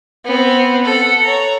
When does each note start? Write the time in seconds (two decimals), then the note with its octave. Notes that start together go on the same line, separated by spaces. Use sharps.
0.25 B3 C4
0.85 A4 F#5
1.23 C#5 A#5